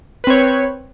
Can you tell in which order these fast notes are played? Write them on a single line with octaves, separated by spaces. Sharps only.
B4 C4 C#5